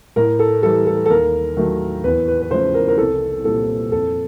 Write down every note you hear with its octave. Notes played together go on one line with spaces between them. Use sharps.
A2 A#4
A4
E3 G3 A4
A4
A4
D#2 A#4
D#3 F#3 A3
E2 B4
B4
B4
C#3 F3 A3 C5
A#4
A#4
C2 A4
A#2 G3 A4
F2 A4